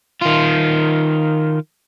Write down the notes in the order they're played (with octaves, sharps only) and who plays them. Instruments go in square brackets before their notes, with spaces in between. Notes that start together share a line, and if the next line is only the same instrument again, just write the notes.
[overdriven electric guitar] D#3 F4